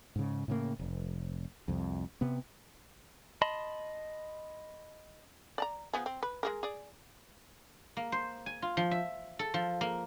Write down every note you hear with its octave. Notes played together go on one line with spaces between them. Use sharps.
G#2 C#3
A2 C#3 A#3
F1
C2 F2
C3 B3
D#5 A5 B5 C6
D5 A5 A#5
F3 B3 G#4
C4
B4
G#3 G#4 A#4
G#4 D5
A#3
C5
G#5
F4
F3
E5
A4
F3
A#3